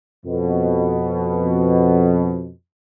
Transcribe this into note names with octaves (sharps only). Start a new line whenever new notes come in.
F2 B2